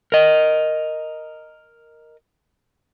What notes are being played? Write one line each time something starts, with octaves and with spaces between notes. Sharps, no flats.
A#4 D#5